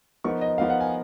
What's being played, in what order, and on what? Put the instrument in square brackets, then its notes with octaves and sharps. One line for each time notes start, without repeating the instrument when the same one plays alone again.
[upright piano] F3 B3 D#4 A#4 [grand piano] C#6
[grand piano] D#5
[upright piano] F3 B3 D#4 A#4 [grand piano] F5
[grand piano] F#5
G#5